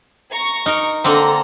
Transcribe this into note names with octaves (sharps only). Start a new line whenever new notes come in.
A#5 C#6
D#4 A#4
D3 A#3 C4 A4 A#5